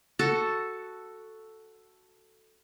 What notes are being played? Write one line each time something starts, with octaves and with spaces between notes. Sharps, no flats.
F#4 A4